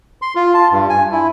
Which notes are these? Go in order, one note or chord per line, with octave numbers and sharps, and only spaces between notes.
C6
F4
A5
G2
G#5
E4